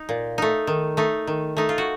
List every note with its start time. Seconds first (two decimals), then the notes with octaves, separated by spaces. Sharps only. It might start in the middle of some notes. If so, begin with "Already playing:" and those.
Already playing: D#4
0.09 A#2
0.38 A3 D#4
0.67 D#3
0.97 A3 D#4
1.27 D#3
1.57 A3 D#4
1.69 F4
1.78 F#4